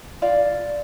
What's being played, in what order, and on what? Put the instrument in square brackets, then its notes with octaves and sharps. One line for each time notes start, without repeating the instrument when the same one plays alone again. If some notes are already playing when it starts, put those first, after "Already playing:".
[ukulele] F4 D5 F5